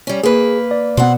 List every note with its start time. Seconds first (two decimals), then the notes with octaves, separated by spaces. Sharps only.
0.07 G3 C#4
0.23 A#3 G#4 B4
0.71 D5
0.97 B2 B3 C4 F#5